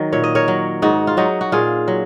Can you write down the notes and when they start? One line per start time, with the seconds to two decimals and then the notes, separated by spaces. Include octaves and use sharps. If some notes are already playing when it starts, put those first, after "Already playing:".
Already playing: D#3 F#3
0.12 A#2 C#5
0.24 D#5
0.35 A#4 C#5
0.48 F#3
0.82 G#2 D#4 F#4
1.07 F4
1.17 F#3 D#4 F#4
1.41 F#4
1.52 A#2 F4 G#4
1.88 F#3